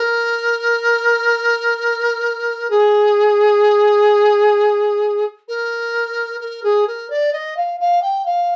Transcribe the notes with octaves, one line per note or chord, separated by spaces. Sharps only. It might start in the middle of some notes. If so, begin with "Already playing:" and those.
Already playing: A#4
G#4
A#4
A#4
G#4
A#4
D5
D#5
F5
F5
G5
F5